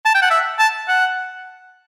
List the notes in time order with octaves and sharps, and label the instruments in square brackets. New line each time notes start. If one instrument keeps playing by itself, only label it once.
[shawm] A5
G5
F#5
E5
A5
F#5